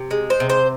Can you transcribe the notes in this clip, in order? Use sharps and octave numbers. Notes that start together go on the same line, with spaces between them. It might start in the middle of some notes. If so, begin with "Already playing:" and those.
Already playing: C3
G#3
C5
C3
C5